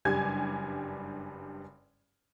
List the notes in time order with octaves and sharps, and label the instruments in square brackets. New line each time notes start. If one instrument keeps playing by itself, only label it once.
[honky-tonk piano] F#1 G2 G3 G4 G#5 G#6